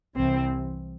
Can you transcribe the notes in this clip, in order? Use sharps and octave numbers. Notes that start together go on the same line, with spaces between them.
C2 C3 E3 C4